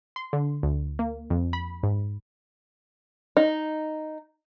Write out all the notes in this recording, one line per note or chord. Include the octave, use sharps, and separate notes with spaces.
C6
D3
D2
A#3
F2
B5
G#2
D#4